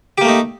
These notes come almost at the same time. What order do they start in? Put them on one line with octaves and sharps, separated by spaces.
G4 A#3 A3 D#4